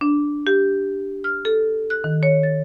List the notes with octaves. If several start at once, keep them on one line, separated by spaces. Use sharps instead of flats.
D4
G4
F6
A4
F#6
D#3
C#5
A6